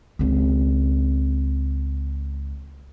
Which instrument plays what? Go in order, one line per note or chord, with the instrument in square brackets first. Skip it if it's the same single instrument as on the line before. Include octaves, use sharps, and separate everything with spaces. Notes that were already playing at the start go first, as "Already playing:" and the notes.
[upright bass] C#2 C4